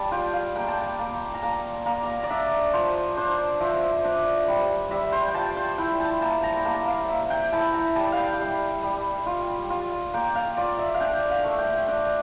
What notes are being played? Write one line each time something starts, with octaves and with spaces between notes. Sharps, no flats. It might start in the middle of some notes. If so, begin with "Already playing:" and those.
Already playing: G3 A5
F4 G5
F5
A#3 G5
A5
G5
A#3
A#5
A#3 A5
A#3 A#5
A#5
D5
D4 E5
F3 C5
D4 C5
F3 E5
D4
G3
G3 E5
C5
G5
F4 A5
C5
E4 G5
A5
A#3 A5
A#5
A#3 A5
F5
A#3 E5
G5
E4 A5
A#5
G3 A5
F5 G5
G3
G3
F4
F4
A#3 G5
F5
F4 D5
E5
F5
D4 G5
F5
A3
G5
D4